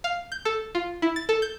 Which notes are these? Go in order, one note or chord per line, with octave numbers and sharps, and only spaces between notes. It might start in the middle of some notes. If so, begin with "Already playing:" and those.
F5
G6
A4
F4
E4
A6
A4
G6